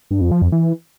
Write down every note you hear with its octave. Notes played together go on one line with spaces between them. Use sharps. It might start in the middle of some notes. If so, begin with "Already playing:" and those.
G2
F2
F3
F2
E3